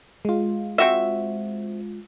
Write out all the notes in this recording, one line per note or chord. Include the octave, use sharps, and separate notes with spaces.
G#3 F4
C4 F#4 E5